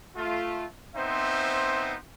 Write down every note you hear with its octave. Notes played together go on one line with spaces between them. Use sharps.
A3 F4
B3 C4 D#4 C5 E5